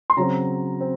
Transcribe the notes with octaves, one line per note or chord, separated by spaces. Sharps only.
C6
C#3 F#3 C4 A#5
C4